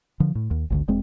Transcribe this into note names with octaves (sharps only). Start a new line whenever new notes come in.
D3 F3
A2
D#2
G#1 D2 D3
E1 G#3 C4